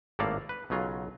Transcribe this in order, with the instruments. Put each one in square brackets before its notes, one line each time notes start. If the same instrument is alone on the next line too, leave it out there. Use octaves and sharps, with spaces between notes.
[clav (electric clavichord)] G#1 A2 A#3 A4 D5 F5
B4
B1 C#3 F#3 F4